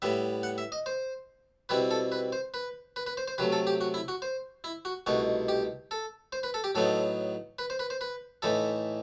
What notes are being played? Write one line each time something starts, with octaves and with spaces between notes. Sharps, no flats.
A2 G3 B3 E5
F#5
E5
D#5
C5
B2 G3 C4 E4 B4
A4
B4
C5
B4
B4
B4
C5
C5
C3 F#3 A3 B4
A4
G4
F#4
E4
F#4
C5
E4
F#4
C2 B2 A3 D#4 F#4
G4
A4
C5
B4
A4
G4
A2 F#3 B3 D#4 A4
B4
C5
B4
C5
B4
A2 E3 A3 D#4 A4